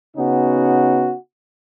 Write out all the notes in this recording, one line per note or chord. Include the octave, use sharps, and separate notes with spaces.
C#3 B3 C#4 D#4 F#4